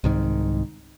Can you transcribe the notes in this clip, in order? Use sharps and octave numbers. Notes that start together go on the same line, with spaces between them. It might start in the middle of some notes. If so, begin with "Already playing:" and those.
C2 G#2 D#3